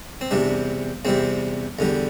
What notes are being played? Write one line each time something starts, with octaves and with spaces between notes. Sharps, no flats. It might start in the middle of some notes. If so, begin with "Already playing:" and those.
C4
E2 C3 G3 D4
E2 C3 G3 C4
E2 D3 G3